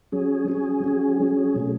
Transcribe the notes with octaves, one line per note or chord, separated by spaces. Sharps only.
F#3 C#4 G#4
F#3 C#4 G#4
F#3 C#4 G#4
F#3 C#4 G#4
B2 F#3 A3